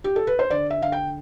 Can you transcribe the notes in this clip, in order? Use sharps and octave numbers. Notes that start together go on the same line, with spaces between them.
G4
A4
B4
C5
D3 D5
E5
D3 F5
G5